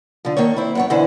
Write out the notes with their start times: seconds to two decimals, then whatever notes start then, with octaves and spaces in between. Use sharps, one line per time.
0.25 D3 F3
0.37 D#3 A#3 A4 C#5
0.57 C4 E4
0.75 F#2 B3 C#5
0.90 B2 D3 E3 E4 C5